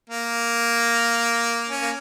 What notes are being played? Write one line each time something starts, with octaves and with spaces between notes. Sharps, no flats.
A#3
C#4
A#3